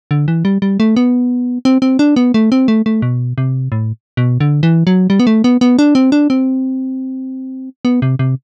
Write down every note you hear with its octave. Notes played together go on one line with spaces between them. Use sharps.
D3
E3
G3
G3
A3
B3
C4
C4
D4
B3
A3
C4
A3
A3
B2
C3
A2
B2
D3
E3
F#3
G3
B3
A3
B3
B3
D4
C4
D4
C4
B3
C3
C3